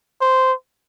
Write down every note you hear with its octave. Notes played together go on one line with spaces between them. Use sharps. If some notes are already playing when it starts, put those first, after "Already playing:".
C5